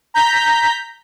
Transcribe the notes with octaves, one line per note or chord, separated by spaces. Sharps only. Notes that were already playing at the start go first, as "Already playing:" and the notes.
A#5 G6 B6